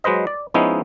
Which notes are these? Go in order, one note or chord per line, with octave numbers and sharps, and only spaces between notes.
F#3 G#3 B4 C5 D#5
D5
F3 G#3 B3 C#4 D#4 E4